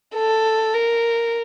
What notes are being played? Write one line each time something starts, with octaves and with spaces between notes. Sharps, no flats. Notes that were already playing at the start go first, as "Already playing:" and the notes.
A4
A#4